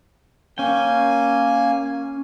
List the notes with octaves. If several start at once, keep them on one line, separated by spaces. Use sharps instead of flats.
A#3 C#4 G5 G#5